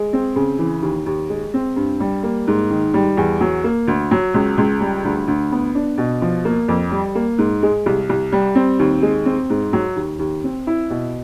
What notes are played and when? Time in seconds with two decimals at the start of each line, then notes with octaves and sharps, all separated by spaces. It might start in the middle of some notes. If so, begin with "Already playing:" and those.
Already playing: G#3
0.13 C4
0.36 C#3
0.59 E3
0.82 D#2
1.06 D#2
1.30 G#3
1.54 C4
1.76 G2
2.00 G3
2.23 A#3
2.47 G#2
2.70 D#3
2.94 G3
3.17 E2
3.41 F#3
3.64 A#3
3.88 D2
4.11 F#3
4.34 C#2
4.58 C#2
4.80 G3
5.04 D2
5.28 D2
5.52 B3
5.75 D4
5.98 B2
6.22 F3
6.45 A#3
6.68 F2
6.91 G3
7.15 A#3
7.38 G#2
7.63 G#3
7.86 C2
8.09 C2
8.32 G3
8.55 C4
8.80 D#2
9.02 G#3
9.26 C4
9.50 G#2
9.73 F#3
9.96 D#2
10.19 D#2
10.44 C4
10.67 E4
10.90 B2